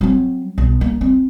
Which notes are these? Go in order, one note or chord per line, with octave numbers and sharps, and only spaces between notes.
F#3 C4
B1
A#3
C4